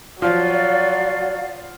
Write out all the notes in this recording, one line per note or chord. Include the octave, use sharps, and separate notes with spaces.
F3 F#3 D5 F5